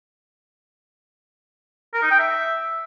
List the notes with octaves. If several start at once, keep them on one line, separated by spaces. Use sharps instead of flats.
A#4
D#4
G5
E5